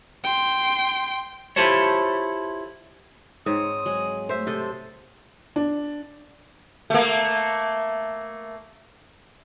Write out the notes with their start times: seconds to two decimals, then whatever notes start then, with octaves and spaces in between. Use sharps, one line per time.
0.24 G5 C6
1.56 E4 F4 G4 A4 C5 C#5
3.46 G#2 C4 C#5 D#6
3.86 F#3 G#3
4.29 A3 C5 E5
4.47 C3 A4 D#5
5.56 D4
6.90 A3 A#3